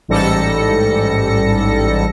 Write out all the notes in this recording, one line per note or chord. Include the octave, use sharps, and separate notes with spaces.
A1 G#2 G3 A4 A#6 C#7